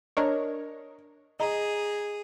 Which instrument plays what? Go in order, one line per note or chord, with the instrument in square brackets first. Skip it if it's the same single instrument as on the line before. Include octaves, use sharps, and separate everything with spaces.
[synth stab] D4 A#4 C#5 [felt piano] D#5
[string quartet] G#4 [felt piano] D#5 A#5